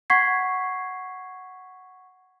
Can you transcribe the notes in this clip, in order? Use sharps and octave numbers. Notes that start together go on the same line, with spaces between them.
F#5 C#6 G#6 B6 C7